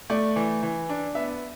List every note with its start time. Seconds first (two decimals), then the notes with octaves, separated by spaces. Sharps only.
0.10 A3 D5
0.36 E3
0.63 E3
0.89 D4
1.15 B3 E5